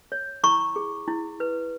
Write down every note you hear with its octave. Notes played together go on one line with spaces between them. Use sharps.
C#5
E4 A#5 C#6
G#4
E4
B4